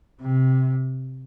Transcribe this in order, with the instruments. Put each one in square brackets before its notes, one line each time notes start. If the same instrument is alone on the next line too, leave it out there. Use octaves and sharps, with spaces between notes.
[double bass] C3